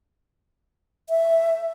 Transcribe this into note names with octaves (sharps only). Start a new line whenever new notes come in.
E5